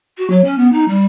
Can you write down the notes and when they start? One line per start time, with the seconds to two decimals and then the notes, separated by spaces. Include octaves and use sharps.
0.18 F#4
0.30 F#3
0.44 C#4
0.58 B3
0.72 D#4
0.89 G3